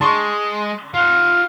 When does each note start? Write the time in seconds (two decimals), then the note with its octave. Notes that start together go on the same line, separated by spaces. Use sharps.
0.01 G#3 A5 C6 C#6
0.94 F4 F5 F#5